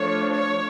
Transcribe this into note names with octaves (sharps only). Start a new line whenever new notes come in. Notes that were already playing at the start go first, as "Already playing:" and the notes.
Already playing: F3 A3 D4 C#5
C#5